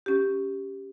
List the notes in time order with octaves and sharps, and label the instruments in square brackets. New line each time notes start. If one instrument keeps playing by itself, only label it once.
[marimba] C#4 G4